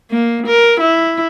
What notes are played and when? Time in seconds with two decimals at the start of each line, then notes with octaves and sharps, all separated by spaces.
0.11 A#3
0.47 A#4
0.80 E4